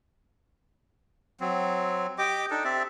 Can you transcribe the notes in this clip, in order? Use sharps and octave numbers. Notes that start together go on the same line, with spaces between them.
F#3 C4
G4 D#5 G5 D6
D4 D#4 A4
C4 G4 D5 E5